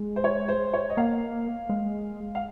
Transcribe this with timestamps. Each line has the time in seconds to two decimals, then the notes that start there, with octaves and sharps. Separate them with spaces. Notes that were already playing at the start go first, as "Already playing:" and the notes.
Already playing: G#3
0.16 C5
0.24 C#5
0.48 C5
0.73 C#5
0.90 D#5
0.97 A#3 F5
1.69 G#3
2.35 F5